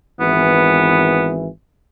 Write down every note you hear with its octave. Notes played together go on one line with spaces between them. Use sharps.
G#1 E3 B3